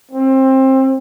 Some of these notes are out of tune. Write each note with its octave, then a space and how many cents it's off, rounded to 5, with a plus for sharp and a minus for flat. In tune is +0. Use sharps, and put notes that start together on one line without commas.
C4 +25